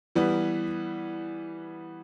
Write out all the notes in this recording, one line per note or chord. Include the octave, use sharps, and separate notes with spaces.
E3 G3 B3